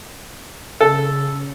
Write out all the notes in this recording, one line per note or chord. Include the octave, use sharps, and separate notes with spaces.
C#3 A4